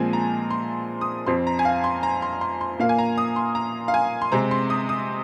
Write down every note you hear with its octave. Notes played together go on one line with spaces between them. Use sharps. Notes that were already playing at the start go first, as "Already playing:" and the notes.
Already playing: A#2 F3 G#3 C4 G#5
A#5
C6
D#6
F2 F3 C4 C6
A#5
G#5
F5
C6
A#5
C6
C6
C6
A#2 A#3 F5
G#5
A#5
D#6
C6
A#5
F5
G#5
C6
C3 G#3 C4 A#5
C6
D#6
D#6